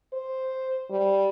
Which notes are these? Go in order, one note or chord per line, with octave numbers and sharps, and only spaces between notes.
C5
G3